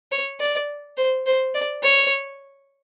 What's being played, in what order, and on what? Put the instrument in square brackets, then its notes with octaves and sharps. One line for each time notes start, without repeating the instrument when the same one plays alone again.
[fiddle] C#5
D5
C5
C5
D5
C#5